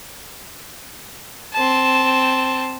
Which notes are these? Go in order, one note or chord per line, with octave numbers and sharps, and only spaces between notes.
C4 A5